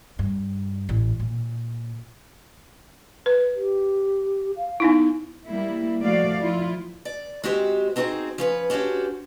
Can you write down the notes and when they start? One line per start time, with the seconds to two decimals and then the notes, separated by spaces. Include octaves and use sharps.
0.19 G2
0.89 A1
1.20 A#2
3.26 B4
3.56 G4
4.57 F5
4.80 B3 D#4 E4
5.47 G3 A#3 E4
6.00 F3 A3 F#4 D5 F5
6.39 F3 E4 F4
7.05 D5
7.44 G#3 C4 F#4 G4 C5
7.96 B3 C4 D#4 F#4 G#4 C5
8.38 F3 C#4 B4
8.70 C#4 D4 F#4 G4 C5